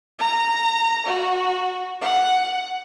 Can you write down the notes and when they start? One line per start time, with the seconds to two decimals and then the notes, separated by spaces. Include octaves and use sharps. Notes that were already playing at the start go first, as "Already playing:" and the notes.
0.19 A#5
1.06 F#4
2.01 F#5